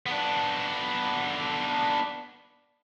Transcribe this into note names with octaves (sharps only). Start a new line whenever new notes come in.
B3 D4